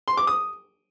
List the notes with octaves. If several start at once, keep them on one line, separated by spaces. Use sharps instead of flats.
C6
D6
D#6